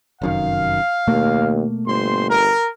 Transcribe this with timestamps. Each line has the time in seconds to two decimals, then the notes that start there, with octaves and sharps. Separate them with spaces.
0.22 F1 F#2 D#3 F5
1.07 D#2 B2 A3 A#3
1.86 G1 C5 C6
2.29 A#4